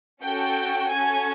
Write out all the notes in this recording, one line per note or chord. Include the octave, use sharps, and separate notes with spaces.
C#4 F#4 A4 G5
C#4 F#4 A4 G#5